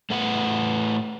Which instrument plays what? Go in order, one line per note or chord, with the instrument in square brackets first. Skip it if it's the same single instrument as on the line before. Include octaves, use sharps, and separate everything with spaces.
[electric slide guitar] A2 A3 B4 F#5